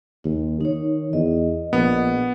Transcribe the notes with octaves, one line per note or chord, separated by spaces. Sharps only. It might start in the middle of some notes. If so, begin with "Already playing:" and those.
D#2
D#3 D#4 C#5
E2 D#5
A#1 B3